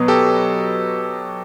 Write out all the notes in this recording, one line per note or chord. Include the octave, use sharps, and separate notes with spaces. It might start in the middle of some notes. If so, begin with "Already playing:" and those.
Already playing: B2 F#3 B3
G4 A4